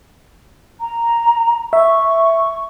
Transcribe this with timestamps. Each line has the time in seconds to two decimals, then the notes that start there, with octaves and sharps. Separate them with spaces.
0.81 A#5
1.73 E5 C#6